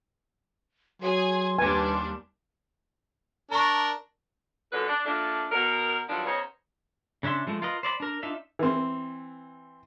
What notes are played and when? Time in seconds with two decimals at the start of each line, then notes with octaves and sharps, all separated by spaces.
1.02 F#3 G#4 G#5 C6
1.58 D#2 G3 D4 B4 G#5
3.51 D4 A#4 A#5 C#6
4.72 F#2 A#2 D3 A4 B4
4.87 D4
5.06 A#2 A3 D4
5.51 B2 A#4
6.09 G2 D#3 F3 F#3 D4
6.26 C#3 B3 D#4 C5 C#5
7.23 C#3 C#4 D4 E5 C6
7.47 F3 G#3 A3
7.62 F4 A#4 B4 D#5
7.83 C5 D5 D#5 B5
8.00 D4 A#4
8.23 D4 D#4 F4 E5
8.59 E3 C4